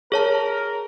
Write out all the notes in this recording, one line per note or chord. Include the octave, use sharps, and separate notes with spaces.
G#4 A#4 C#5 A5